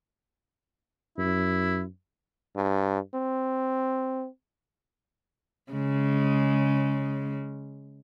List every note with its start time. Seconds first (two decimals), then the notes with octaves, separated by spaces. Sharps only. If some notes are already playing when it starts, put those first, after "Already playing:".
1.18 F#2 E4
2.56 G2
3.14 C4
5.72 C#3 G#3